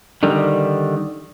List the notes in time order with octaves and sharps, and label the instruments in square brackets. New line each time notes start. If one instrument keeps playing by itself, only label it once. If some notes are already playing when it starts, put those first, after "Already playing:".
[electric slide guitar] D3 D#3 G3